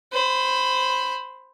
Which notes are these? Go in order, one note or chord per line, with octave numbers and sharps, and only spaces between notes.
C5 B5